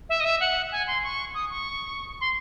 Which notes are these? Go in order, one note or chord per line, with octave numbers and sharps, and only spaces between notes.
E5
D#5
E5
F#5
G#5
C6
C#6
D#6
C#6
C6